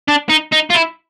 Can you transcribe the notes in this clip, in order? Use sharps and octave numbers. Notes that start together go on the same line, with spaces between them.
D4
D#4
D#4
F4
E4